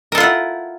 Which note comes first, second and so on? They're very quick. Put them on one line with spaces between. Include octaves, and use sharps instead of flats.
A#4 A4 F4 F#5 E4